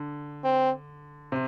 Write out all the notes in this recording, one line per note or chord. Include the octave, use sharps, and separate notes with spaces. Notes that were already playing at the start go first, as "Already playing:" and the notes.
Already playing: D3
C4
C3